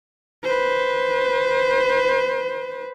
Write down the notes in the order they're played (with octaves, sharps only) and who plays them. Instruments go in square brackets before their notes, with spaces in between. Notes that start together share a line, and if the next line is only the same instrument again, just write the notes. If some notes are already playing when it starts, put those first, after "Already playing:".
[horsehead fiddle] B4 C5